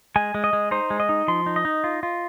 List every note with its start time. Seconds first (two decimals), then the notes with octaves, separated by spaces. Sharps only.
0.16 G#3 G#5
0.35 G#3
0.44 D#5
0.53 G#3
0.71 D#4 C5
0.90 G#3
1.00 D#5
1.09 D#4
1.28 F3 C6
1.46 D#4
1.56 D#5
1.65 D#4
1.84 F4
2.03 F4